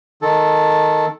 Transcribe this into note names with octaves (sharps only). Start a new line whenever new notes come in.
D#3 A4